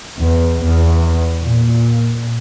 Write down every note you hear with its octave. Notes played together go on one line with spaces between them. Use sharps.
E2
E2
A#2